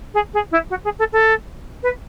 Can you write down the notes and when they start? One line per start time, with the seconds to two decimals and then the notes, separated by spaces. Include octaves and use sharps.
0.14 G#4
0.34 G#4
0.51 E4
0.70 F#4
0.84 G#4
0.99 A4
1.12 A4
1.83 B4